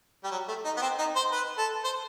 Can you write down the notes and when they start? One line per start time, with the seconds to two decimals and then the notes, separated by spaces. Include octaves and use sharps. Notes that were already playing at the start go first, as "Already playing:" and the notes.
0.24 G3
0.31 F#3
0.48 A3
0.65 D#4
0.77 B3
0.82 C4
0.99 D#4
1.16 C5
1.32 B4
1.58 A4
1.84 C5